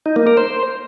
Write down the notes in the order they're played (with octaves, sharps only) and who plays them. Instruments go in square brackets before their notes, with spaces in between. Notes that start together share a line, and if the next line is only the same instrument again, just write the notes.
[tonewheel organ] D#4
A#3
A#4
C5